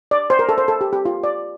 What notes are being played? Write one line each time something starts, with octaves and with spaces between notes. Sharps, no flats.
D5
C5
A#4
A4
C5
A4
G4
G4
F4
D5